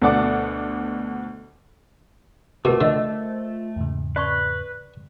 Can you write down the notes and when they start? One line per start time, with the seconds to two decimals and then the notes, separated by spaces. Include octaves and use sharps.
0.02 D2 B2 A4 D5 F#5 D6
2.65 B2 A3 F4 G4 A#4 C5 D6
2.81 D3 D#5 E6
3.76 E2 G#2 C#3
4.16 B4 D5 C6 C#6